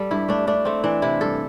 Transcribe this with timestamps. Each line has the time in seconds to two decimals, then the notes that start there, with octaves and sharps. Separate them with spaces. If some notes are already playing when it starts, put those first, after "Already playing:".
Already playing: G3 A4
0.11 G2 E4
0.29 A3 D4
0.47 A3 D4
0.65 A3 C4
0.83 E3 D4
1.02 C3 E4
1.21 G2 A4